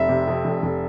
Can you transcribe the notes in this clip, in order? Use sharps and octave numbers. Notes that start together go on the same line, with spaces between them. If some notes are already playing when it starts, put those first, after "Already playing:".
Already playing: F1 E5
C3
F2
F1
F1